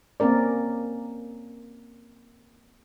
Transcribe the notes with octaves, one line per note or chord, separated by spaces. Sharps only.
A#3 C4 C#4 A#4 D5